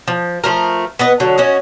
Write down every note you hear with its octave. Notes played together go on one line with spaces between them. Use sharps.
F3
F3 A3 A#4
B3 B4 D#5
D3 F#3
C#4 F#4 D#5